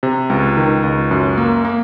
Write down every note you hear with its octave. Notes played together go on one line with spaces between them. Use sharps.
C3
C#2
D#3
C#2
F#2
A#3
A#3